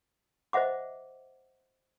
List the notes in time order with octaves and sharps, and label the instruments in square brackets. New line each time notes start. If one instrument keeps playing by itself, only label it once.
[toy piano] C5 D#5 E5 F#5 D6